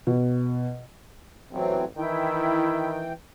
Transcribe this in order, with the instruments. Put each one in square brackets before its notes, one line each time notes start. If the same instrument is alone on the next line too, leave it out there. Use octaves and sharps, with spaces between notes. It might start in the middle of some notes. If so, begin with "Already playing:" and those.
[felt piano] B2
[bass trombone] A1 [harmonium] E3 F#3 C4
[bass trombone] D#3 [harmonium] E3 G5 [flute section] E4